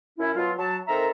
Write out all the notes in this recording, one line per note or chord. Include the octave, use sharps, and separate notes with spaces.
F#2 C#4 E4
B2 F#3 F4
F#3 A5
D#3 C4 A4 A#4 E5 A#5